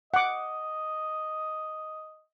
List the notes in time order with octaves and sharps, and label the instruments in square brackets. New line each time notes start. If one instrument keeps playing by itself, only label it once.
[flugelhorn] D#5 [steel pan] F#5 D6